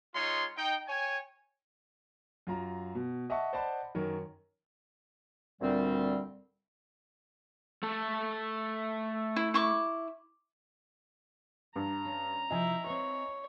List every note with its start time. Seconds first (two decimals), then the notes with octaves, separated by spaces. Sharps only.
0.15 G#3 D#4 F4 C#5 C6
0.57 D#4 G5
0.88 C#5 G5 G#5
2.47 F#2 F4 A#5
2.95 B2
3.30 D#5 E5 F#5 A5 C#6
3.53 C5 D5 D#5 F#5 A5 B5
3.95 F#2 D#3 A#4 C#5
5.61 D2 A#2 G3 C4
7.83 A3 A4
9.36 E4
9.54 E4 C#6 D6
11.76 G2 A#5
12.05 C#4
12.51 C3 F3 D#4 E4 D#5 G#5
12.86 C4 B4 C#5